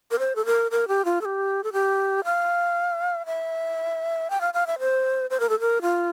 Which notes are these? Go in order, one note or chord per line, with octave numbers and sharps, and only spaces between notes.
A#4
C5
A4
A#4
A#4
G4
F4
A4
G4
A4
G4
F5
E5
G5
F5
F5
E5
C5
C5
A#4
A4
A#4
F4